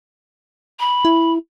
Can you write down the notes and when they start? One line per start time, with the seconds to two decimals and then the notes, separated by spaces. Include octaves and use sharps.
0.80 B5
1.05 E4